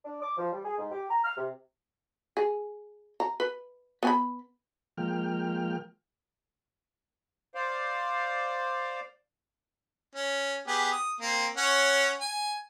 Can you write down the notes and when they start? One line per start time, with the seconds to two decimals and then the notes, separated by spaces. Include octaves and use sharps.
0.05 D4
0.22 D6
0.37 F3
0.53 G3
0.64 G#4
0.78 G#2
0.92 G4
1.10 A#5
1.24 F6
1.37 C3
2.37 G#4
3.20 A#5
3.40 B4
4.03 B3 G#5 B5
4.98 F3 G#3 A#3 G5 F6
7.55 C5 D5 F5
10.15 C#4
10.67 B3 G4 G#4
10.92 D#6
11.21 A#3 C4
11.57 C#4 C#5 F#5
12.21 G#5